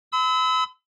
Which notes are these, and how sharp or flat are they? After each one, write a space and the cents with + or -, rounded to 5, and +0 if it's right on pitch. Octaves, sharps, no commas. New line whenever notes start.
B5 +45 E6 -30